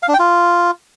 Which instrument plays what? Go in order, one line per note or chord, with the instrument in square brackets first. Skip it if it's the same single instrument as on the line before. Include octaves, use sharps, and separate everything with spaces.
[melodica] F5
D4
G5
F4